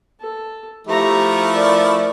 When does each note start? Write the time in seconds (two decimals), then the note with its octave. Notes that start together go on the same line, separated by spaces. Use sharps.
0.20 A4
0.87 F3 A3 E4 G4 A#5
1.53 A#4 D5